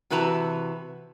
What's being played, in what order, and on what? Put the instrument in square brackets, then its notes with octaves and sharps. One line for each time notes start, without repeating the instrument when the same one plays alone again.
[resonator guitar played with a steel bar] C3 E3 F#4 B4 A5 A#5